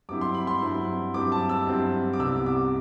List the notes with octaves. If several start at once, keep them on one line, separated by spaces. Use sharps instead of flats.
G2 F#3 C4 E4 D6
C6
B5
C6
G2 F#3 C4 E4
G2 F#3 C4 E4 D6
A5
E6
G2 F#3 C4 E4
D6
C2 C3 G3 B3 E4 E6
D6